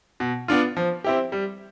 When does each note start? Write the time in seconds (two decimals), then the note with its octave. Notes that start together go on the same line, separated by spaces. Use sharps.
0.20 B2
0.48 B3 D4 F4
0.77 F3
1.04 C4 E4 G4
1.32 G3